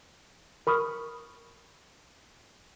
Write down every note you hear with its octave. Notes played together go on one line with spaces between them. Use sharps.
A#4 B5 C#6 D#6 F6